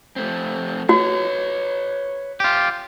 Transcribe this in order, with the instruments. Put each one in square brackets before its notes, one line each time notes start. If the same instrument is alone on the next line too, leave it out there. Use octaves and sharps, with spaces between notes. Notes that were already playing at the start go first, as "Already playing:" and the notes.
[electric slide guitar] F3 A3 C4
[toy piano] F#4 [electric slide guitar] B4 C#5
[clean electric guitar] F4 G4